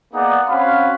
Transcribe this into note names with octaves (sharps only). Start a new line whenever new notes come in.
A#3 B3 D#4 G#4 D5 F#5
C4 C#4 F#4 F5 B5